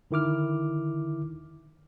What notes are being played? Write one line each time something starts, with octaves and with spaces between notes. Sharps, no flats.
D3 D#3 E4 D6 F6